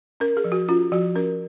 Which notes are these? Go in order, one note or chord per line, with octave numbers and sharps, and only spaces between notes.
C#4 A#4
G#4
F3
F#4
C#4 F4
F3 F#4
C#4 A#4